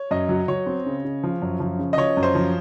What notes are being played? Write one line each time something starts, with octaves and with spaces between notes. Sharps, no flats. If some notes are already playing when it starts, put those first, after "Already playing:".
Already playing: C#5
F#2 D#5
F#3
F#3 C#5
C4
C#3
C#3
F3
F#2
F3
C#3
D#5
F3 C#5
F#2
C5
F3